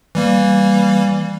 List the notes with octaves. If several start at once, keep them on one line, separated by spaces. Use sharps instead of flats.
E3 G3 A#3